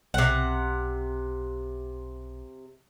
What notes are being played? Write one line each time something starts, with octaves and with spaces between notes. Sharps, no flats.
B1 C3 F#5